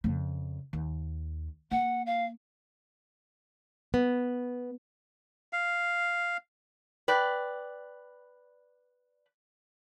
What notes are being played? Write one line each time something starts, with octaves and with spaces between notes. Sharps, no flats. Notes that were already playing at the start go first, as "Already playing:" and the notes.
F2 C#3
D#2
A#3 F#5
F5
B3
F5
B4 D5 G5